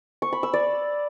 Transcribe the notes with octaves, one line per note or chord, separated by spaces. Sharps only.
C#6
B5
E6
D5